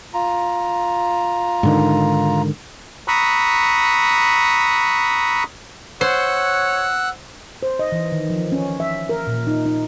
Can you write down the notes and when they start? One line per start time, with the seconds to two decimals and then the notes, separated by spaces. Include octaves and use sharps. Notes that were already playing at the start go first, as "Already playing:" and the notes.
0.14 F4 A#5
1.63 G#2 D3 D#3
3.08 A#5 B5 C#6 D#6 E6 F#6
6.01 C5 C#5 F#5 E6 F#6
7.63 C5
7.79 D#5
7.92 E3
8.12 D#3
8.30 F3
8.52 C#4
8.80 E5
9.09 A#4
9.27 A#2
9.47 D#4
9.66 D#4